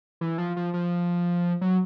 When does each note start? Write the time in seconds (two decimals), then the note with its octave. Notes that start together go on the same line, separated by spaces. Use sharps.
0.21 E3
0.38 F3
0.57 F3
0.74 F3
1.61 F#3